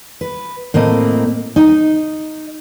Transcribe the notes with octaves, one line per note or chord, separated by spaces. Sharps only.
B4
A2 A#3 C4 D#5
D#4